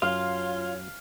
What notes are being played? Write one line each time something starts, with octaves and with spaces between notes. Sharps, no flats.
F#2 F4 C#5 F5